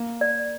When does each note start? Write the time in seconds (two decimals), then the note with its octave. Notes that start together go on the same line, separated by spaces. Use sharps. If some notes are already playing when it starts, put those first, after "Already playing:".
Already playing: A#3
0.21 D5